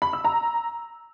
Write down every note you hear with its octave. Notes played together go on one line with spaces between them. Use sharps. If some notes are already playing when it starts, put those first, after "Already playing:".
B5
E6
A#5